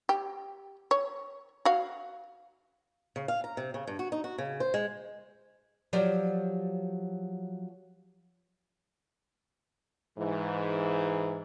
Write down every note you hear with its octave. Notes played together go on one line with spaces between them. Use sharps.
G4
C#5
F#4 F5
C#3
F5
A#5
C3
C#3
G2
F#4
D#4
F#4
C#3
C5
G#3
F3 F#3 G4 D5
G#2 E3